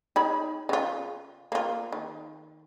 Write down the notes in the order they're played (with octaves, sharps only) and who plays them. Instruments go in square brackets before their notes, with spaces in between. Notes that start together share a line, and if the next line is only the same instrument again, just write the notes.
[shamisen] D#4 C#5 B5
C#3 F4
A#3 F4
D#3